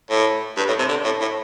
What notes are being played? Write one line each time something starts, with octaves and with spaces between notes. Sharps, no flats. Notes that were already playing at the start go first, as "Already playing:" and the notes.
A2
G2
A2
C3
D3
A2
A2